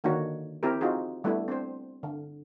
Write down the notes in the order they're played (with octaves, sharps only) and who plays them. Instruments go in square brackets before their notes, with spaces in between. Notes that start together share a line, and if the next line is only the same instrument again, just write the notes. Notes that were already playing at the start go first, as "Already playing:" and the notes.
[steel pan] D3 D#3 A#3 D4 F#4 C#5
C4 E4 G4 A#4
C4 D#4 F4 F#4 G#4
G3 A3 B3 D4 E4
C4 D4 C5
D3